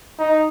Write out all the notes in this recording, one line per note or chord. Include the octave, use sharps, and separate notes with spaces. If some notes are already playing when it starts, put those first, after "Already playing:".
D#4